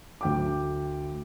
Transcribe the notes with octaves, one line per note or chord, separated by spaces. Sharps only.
D2 G5 D6